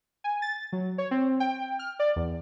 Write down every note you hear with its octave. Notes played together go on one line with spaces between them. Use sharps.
G#5
A6
F#3
C#5
C4
G5
F6
D5
E2